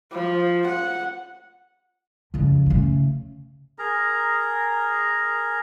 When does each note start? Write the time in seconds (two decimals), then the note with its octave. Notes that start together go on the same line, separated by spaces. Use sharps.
0.12 F3
0.67 F#5
2.34 F2 C#3
2.66 C#3 A3
3.79 G#4 A#4 A#5